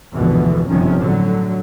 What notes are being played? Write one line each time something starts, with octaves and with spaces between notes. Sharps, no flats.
F1 D2 G#2 B2 D3 E3
G1 F#2 C3 D#3 F3 C#4
A2 D3 F#3